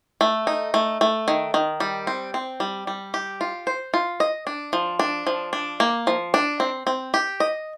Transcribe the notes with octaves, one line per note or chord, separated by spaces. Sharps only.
A3
D#4
A3
A3
D#3
D#3
G3
C4
C4
G3
G3
G4
F4
C5
F4
D#5
D4
F3
D4
F3
D4
A#3
F3
D4
C4
C4
G4
D#5